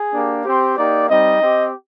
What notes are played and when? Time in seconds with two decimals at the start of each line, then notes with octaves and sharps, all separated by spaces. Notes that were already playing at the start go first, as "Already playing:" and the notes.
Already playing: G#4
0.14 A#3 D4 G4
0.45 C4 G4 C5
0.77 A#3 D#4 G4 D5
1.09 G3 C4 D#4 D#5
1.41 C4 G4